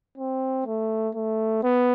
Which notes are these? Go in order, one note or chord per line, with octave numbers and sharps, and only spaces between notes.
C4
A3
A3
B3